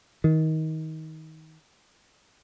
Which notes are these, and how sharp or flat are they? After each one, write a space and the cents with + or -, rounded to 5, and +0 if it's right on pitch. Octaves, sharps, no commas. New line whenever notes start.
D#3 +25